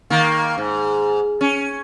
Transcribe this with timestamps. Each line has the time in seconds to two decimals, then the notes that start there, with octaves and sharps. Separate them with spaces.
0.10 D#3 A#3
0.58 G#2
1.41 C#4